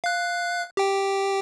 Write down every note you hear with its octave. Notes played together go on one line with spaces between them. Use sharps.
F5 F#6
G4 G5